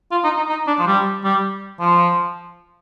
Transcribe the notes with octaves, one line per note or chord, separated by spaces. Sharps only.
F4
D#4
D#4
D#4
D4
F3
G3
G3
F3